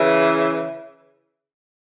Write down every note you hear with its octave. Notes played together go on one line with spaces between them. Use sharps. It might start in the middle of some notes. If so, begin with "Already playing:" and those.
Already playing: C#3 E3